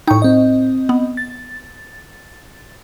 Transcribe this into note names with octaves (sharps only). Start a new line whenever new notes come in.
A2 D#4 G5 C#6
C4 D#5
B3
A6